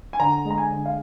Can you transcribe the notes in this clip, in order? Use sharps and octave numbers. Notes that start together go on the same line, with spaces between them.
G#5
D3 A#5
G#3
A#5
G#5
D3
F5